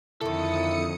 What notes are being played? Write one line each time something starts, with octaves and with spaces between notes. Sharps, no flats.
F2 D3 D#3 E4 A4 D#6 C#7